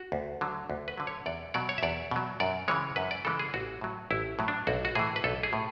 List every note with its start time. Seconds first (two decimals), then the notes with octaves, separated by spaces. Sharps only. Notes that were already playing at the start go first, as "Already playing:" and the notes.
Already playing: F#4
0.12 D2
0.41 D3 F#3
0.70 D2
0.88 B4
0.98 D3 F#3
1.07 C#5
1.26 E2 D5
1.54 B2 F#3 D5
1.69 C#5
1.78 E5
1.83 E2 D5
2.11 B2 F#3
2.40 F#2 D5
2.68 C#3 E3 G#3 C#5
2.96 F#2 B4
3.11 D5
3.25 C#3 E3 G#3 A4
3.39 G#4
3.54 A1 F#4
3.81 A2 F#3
4.11 A1 E4
4.39 A2 F#3
4.48 D4
4.67 B1 F#4
4.85 F#4
4.95 A2 E3 G#4
5.16 B4
5.24 B1 A4
5.43 G#4
5.53 A2